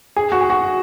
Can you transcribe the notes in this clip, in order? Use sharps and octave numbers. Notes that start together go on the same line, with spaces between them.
G#4
F#4
G#4
F#4